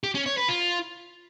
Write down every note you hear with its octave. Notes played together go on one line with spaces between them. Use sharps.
G4
C#4
C#5
B4
F4